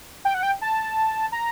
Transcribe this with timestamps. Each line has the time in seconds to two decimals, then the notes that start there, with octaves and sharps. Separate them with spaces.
0.25 G5
0.34 F#5
0.43 G5
0.62 A5
1.32 A#5